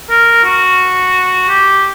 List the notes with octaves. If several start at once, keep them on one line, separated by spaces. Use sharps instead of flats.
A#4
F#4
G4